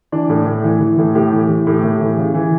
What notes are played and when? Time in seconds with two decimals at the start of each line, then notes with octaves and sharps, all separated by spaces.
0.12 E3 D4
0.29 A2
0.47 A2
0.64 E3
0.81 E3
0.98 A2
1.15 A2 G4
1.32 E3
1.49 E3
1.67 A2 G4
1.83 A2
2.00 E3
2.18 C#3
2.34 E3